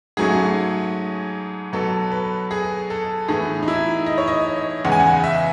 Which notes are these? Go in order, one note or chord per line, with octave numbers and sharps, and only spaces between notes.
G#2 F#3 A3 C#4 G#4
B2 F#3 B3 A4
B4
G#4
A4
A2 E3 B3 G#4
D#4
E4
D#5
C#5
D#5
E2 C#3 G#3 B3 F#5
G#5
F#5
E5